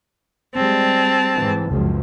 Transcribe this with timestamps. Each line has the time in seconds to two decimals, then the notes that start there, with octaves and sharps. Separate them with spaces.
0.55 G3 G#3 C4 A5
1.36 G#2 E3
1.69 F#1 C#2 F3